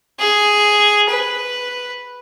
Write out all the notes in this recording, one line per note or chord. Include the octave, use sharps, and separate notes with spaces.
G#4
B4